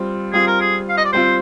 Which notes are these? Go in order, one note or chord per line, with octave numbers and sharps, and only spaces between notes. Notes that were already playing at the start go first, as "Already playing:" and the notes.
Already playing: G3 C4 F4
G3 C4 F4 G#4
A#4
G#4
F5
D#5
D5
G3 C4 F4 C5